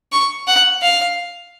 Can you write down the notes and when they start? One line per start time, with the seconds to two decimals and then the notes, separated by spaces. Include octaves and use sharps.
0.12 C#6
0.47 F#5
0.82 F5